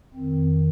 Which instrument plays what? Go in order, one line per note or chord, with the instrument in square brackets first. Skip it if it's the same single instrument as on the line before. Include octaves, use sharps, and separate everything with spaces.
[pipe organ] F2 D#3 C4